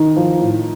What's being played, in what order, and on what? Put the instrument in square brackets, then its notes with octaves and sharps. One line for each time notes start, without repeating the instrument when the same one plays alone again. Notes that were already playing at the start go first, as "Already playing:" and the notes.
Already playing: [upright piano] D#3 D#4
F3
A2